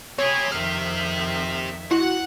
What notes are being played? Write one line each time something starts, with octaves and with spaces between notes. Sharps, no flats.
C4 G4 C#5 G#5 B5 D#6
F2 D#3 E5 F6
E4 F#4 F#5